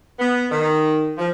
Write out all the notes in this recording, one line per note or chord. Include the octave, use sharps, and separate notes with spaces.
B3
D#3
F3